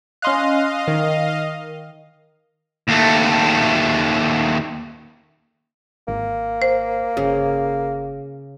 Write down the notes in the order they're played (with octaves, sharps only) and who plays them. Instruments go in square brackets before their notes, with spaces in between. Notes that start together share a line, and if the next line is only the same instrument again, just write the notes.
[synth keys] C#4 C6 F#6 [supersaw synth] D#5 F5
[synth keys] D#3
[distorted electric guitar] D#2 A3
[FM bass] G#1 [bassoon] A#3
[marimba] C5
[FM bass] G1 [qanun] C#3